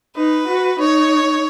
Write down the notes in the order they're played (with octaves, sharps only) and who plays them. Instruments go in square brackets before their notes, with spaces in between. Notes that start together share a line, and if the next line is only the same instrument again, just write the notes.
[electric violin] D#4 [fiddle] B4
[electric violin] F#4
[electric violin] D#4 [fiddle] C#5